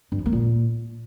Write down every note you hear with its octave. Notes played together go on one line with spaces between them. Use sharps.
G2
F3
A#3
A#2